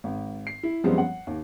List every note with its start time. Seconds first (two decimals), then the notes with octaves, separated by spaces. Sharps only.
0.04 G#1
0.47 C7
0.63 E4
0.84 F#2 F3 G3 G#3 B3 C4
0.98 F#5
1.27 D#2